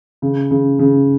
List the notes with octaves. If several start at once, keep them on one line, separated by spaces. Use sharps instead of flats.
C#3
C#3
C#3